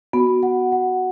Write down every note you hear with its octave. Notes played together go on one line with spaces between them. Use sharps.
B3 F#4
F#5
F#5